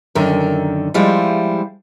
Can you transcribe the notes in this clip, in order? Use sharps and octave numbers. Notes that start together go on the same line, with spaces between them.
F#2 D3 D#3
F3 G3 G#3 E4 F4